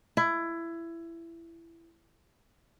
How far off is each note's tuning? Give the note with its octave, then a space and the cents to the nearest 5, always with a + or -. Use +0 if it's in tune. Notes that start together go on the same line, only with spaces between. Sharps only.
E4 +20